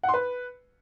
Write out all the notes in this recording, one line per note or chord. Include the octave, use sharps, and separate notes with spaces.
F#5
C6
B4